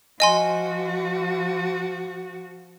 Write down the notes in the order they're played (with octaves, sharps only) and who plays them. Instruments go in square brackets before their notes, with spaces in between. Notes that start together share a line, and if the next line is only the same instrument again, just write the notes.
[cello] F3 F#4 [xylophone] D#5 G#5 C6